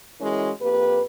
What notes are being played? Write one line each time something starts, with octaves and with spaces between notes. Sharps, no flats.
E3 G#3 C#4 E4 F#4 A#4
F2 A#3 G4 B4